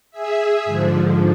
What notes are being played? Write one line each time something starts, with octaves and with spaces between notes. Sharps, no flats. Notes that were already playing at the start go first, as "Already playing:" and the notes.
G#4 E5
G#2 D3 F3